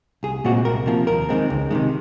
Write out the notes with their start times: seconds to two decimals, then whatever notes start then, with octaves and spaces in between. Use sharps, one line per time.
0.23 C2 G#4
0.45 A#2 G#3 C4 F#4
0.65 C2 A#4
0.86 C3 F3 A#3
1.07 D#2 A#4
1.29 D#3 G#3 C4
1.50 C#2
1.71 C3 D#3 G#3